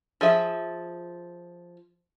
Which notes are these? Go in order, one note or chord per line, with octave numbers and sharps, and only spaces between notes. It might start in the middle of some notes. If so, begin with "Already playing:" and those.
F3 G#4 E5